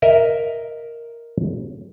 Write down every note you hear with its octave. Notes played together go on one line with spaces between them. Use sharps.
A#4 D#5 E5 A#5